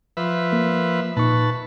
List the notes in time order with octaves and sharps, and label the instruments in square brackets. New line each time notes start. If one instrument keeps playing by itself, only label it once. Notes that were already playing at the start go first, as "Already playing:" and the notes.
[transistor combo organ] F3 B4 E5
[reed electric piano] A#3
[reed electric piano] A#2 D#4 C#6 [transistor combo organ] B4 A5